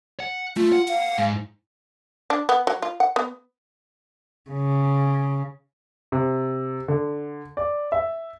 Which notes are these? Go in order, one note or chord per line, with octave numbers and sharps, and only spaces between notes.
F#5
A3 F4
F#5
F5
G#2
D4
B3
F#3
F4
F#5
B3
C#3
C3
D3
D5
E5